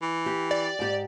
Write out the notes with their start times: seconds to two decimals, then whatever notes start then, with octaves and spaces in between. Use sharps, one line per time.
0.02 E3
0.26 G4
0.51 D5
0.79 G#2 G4